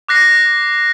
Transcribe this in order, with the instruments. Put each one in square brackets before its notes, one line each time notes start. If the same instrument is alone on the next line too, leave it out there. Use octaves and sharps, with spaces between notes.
[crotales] D6 F#6 A#6 C7